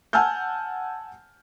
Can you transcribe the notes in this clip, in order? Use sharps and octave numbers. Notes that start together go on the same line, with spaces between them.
F#5 G#5 A5 E6 F6 G6